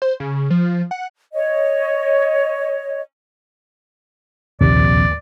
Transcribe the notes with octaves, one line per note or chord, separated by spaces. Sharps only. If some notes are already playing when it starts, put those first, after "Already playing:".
C5
C#3
F3
F#5
C#5 D#5
A#1 D#2 C3 D5